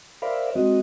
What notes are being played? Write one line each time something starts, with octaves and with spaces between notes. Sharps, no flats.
A#4 C5 D5 E5 F5 B5
G#3 C4 F#4 D#5